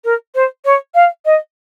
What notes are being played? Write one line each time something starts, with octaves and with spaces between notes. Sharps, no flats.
A#4
C5
C#5
F5
D#5